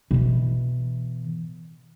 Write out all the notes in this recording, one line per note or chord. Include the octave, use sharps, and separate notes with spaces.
B2 E3